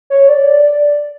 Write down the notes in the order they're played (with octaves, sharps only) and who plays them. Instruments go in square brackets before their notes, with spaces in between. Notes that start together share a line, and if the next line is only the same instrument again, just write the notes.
[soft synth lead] C#5
D5